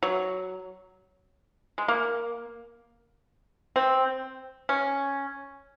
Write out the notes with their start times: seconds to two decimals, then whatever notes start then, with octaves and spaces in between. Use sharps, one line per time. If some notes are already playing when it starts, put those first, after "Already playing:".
0.03 F#3
1.78 G#3
1.88 A#3
3.76 C4
4.69 C#4